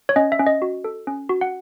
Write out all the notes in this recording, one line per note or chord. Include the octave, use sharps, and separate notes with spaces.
C#5
C#4 D#5
E5
C#4
D#5
F#4
A4
C#4
F#4
F#5